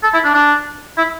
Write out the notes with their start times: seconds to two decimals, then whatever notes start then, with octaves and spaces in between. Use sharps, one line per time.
0.03 A4
0.13 E4
0.24 D4
0.34 D4
0.98 E4